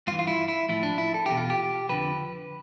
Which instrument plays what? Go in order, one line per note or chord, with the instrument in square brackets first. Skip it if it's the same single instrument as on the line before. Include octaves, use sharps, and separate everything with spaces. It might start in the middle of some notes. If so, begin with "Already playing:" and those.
[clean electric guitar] G2 F4
E3
F4
E4
E4
A2 F3 E4
D4
E4
A4
E2 B2 G4
F4
G4
F2 D3 F3 B4